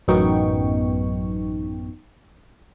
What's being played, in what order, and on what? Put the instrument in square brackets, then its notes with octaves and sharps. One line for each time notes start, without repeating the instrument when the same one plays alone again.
[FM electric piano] A1 F#2 B3 D#4 G5 C#6